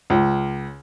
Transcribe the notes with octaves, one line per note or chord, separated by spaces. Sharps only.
C#2